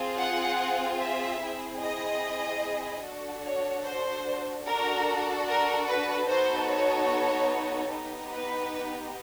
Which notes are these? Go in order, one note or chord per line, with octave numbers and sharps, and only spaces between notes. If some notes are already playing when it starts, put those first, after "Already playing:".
Already playing: C4 F4 G#4
F#5
E5
C4 E4 G#4
D#5
D4 F#4 A4
C#5
C5
D4 F#4 A4 A#4
A#4
B4
B3 D#4 F#4 A4 C5
C#5
B3 D#4 G4
B4